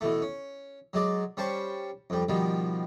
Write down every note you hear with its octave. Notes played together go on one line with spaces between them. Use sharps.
B2 E3 A3
C#4
F#3 G#3 D5
G3 C#4 C5 A5 C#6
F2 G3
B2 D#3 F3 G3